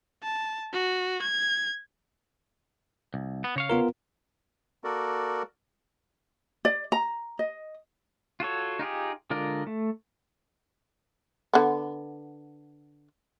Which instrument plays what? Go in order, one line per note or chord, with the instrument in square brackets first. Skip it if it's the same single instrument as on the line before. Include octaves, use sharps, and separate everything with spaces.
[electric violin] A5
F#4
G#6
[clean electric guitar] C2
B3
C#3 C#5 F5
[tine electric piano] B3 F4 A#4
[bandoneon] A#3 F#4 A4 A#4 D5
[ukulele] D5
A#5
D#5
[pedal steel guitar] F4 F#4 A4 C#5
D#4 F4 G4 G#4
D3 G#3 F4 A#4 D5
A3
[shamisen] D3 B3